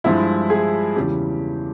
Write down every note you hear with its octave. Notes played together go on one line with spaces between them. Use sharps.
G2 F3 G#3 E4
G#4
E2 C#3 E3 G3 G4